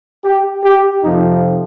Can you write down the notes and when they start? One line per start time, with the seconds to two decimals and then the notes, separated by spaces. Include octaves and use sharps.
0.25 G4
0.64 G4
1.04 F2 C3 F3 D#4